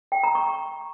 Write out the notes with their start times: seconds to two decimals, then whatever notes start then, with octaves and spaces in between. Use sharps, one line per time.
0.12 G5
0.23 A#5
0.35 C#6